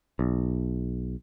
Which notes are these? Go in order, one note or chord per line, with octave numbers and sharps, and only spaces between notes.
B1